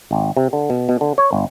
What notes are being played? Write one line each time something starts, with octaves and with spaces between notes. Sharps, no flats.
G#1
C3
D3
B2
B2
D3
C#5
G1